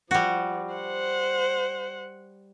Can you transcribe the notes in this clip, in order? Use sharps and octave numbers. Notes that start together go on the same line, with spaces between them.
F3 G3 F#4
C5 F#5